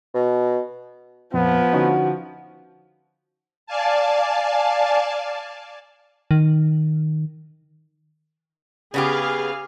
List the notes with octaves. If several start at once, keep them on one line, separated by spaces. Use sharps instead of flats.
B2
F2 A#2 F3 B3
D3 C#4 D#4 F#4
D5 F5 G#5 A5
D#3
C#3 B3 G4 G#4 F5